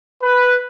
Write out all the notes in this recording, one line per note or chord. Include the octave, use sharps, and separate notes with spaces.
B4